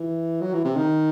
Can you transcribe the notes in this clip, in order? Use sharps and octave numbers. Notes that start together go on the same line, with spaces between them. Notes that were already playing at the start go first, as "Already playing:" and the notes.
Already playing: E3
F#3
E3
C3
D#3